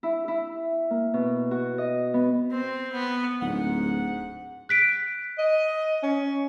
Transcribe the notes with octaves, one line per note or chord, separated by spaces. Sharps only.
E4
E4
A#3
B2
F#4
D#5
B3
C4
B3
D1 G#2 F#5
F#6 B6 D7
D#5
C#4